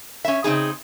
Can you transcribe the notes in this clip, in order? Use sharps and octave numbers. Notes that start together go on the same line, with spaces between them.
C#4 E5
C#3 C4 D#4 G#4